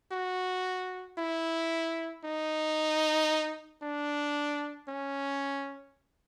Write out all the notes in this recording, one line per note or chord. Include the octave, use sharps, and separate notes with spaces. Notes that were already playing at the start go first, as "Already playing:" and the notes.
F#4
E4
D#4
D4
C#4